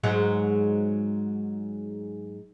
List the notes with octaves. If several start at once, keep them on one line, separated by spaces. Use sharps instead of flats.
G#2 F#3 G#3